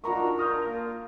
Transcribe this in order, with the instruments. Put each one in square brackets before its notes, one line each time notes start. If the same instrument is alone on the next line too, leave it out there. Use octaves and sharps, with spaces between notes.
[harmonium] D4 D#4 F#4 [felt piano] F4 A#5 C#6 [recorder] A#4
[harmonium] D4 F4 [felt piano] D#6 F6 G6
[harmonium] A#3 F4